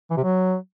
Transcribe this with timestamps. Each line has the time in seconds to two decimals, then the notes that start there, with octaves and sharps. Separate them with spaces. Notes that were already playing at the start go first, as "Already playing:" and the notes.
0.11 E3
0.17 C3
0.24 F#3